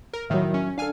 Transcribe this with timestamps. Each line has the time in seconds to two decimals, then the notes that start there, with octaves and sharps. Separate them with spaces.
0.13 A#4
0.30 A2 D#3 F#3 E5
0.54 C#4
0.78 D4 A4 F5 G#5 F6